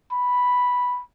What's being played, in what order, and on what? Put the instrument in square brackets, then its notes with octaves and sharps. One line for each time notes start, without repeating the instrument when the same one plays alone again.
[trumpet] B5